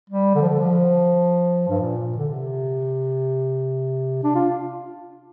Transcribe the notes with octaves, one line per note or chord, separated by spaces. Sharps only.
G3
D3
F3
D3
F3
G2
A#2
D3
C3
D4
F4